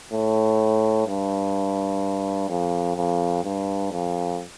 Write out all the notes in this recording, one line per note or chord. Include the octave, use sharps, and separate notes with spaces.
A2
G2
F2
F2
G2
F2